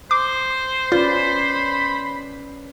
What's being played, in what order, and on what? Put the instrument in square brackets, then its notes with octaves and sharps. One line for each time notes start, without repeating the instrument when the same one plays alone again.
[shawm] C5 [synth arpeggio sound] D6
[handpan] C#4 B4 D5 [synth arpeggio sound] F4 [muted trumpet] B5